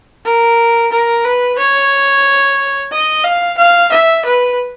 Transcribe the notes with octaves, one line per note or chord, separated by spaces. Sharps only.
A#4
A#4
B4
C#5
D#5
F5
F5
E5
B4